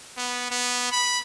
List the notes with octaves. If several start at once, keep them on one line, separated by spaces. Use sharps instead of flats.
B3
B3
B5